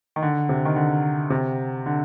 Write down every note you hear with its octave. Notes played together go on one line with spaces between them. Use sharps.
D#3
D3
C3
D#3
D3
C3
D3